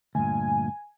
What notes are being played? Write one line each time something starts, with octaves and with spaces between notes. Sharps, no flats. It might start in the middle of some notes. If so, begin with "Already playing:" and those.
D2 G2 A#2 G#5